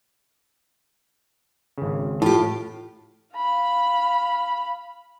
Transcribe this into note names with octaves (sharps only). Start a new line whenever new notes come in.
G#1 C#3
A2 F4 G4
F5 B5